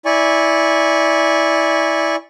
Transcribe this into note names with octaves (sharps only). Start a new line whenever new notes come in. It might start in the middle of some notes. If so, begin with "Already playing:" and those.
E4 D5 G#5 C#6